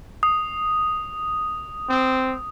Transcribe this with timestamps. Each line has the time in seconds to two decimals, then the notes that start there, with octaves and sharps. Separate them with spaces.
0.23 D#6
1.89 C4